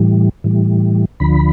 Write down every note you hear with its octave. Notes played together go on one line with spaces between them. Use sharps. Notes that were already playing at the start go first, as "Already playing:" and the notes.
Already playing: A2 E3 G3
A2 E3 G3
D2 D3 F3 B5